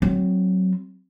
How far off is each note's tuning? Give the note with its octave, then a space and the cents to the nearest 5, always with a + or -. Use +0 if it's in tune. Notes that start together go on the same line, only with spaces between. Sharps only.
F#3 +10 C4 +10